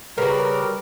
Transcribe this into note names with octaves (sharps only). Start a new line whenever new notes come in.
C#3 G3 F#4 A#4 B4 A#5